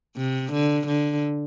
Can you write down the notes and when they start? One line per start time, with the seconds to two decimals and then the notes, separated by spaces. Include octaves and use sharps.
0.17 C3
0.52 D3
0.87 D3